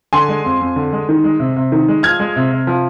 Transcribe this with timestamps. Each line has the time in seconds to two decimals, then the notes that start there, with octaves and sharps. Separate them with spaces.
0.13 D3 G#5 C6
0.29 G#3
0.45 F2
0.61 F2
0.76 D3
0.93 G#3
1.09 D#3
1.24 G#3
1.40 C3
1.56 C3
1.72 D#3
1.88 G#3
2.03 F3 F6 G#6
2.19 G#3
2.36 C3
2.51 C3
2.67 F3